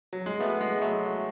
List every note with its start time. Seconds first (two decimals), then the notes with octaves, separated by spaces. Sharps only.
0.13 F#3
0.26 G#3
0.40 A3 B3
0.61 G#3
0.82 F#3 A3